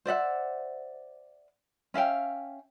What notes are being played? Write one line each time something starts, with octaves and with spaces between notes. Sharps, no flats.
C5 D5 E5 F#5
C#4 E5 F5 G5